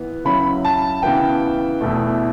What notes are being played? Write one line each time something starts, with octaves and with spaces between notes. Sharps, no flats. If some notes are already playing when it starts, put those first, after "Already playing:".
Already playing: E3 B3
C#3 F#3 C#4 E4 B5
A5
C#3 E3 B3 G5
E2 B2 A3